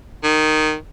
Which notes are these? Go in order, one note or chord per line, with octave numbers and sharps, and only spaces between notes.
D#3